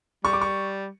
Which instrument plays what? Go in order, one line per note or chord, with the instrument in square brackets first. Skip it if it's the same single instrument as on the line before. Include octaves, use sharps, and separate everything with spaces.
[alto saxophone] G3 [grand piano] C#6
[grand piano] D6
C#6